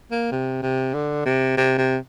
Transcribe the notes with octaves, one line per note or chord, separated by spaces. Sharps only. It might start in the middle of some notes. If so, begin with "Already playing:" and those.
A#3
C3
C3
D3
C3
C3
C3